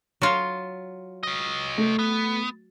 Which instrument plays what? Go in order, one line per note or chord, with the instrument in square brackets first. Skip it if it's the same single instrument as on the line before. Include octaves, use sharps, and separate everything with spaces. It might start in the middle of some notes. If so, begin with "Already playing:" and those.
[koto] F#3 F4
[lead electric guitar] C#5 D#5
[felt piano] A3
[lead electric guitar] B3